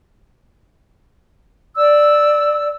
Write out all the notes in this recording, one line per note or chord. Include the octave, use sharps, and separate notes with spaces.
D5 E6